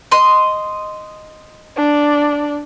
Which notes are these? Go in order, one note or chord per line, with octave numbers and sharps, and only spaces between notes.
D#5 C6
D4 D5